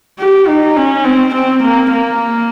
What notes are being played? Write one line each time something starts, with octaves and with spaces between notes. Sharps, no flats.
G4
D#4
C#4
C4
C4
A#3
A#3